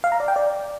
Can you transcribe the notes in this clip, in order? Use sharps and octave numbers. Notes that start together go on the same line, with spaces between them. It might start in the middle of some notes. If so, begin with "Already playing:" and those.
F5
A#5
D5
G5
D5